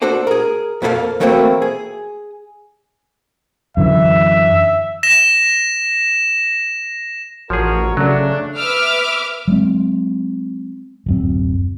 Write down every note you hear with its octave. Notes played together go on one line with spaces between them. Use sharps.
D4 F#4 A4 C5 D5
G#4 A#4
F2 A#3 C#4 E4 A4 F5
E3 F#3 A3 A#3 C4
G#4
F#2 D3 E3 E5
A#6 E7
A1 F3 F#4 G#4 A#4 C#5
C#3 F#3 A3 D4 F#4
B4 E5 D6 E6 F6
F#3 G#3 C4
D1 F#2 C4